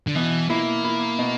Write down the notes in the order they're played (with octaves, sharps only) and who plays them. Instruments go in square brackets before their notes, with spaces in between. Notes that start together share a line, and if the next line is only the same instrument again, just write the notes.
[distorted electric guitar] D3
[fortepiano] B2 [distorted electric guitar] E3
[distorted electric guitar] A#3 [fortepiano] E4
[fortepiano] E4
B2